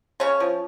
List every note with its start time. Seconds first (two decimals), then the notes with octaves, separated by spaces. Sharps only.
0.20 C#3 C#4 C#5
0.40 F3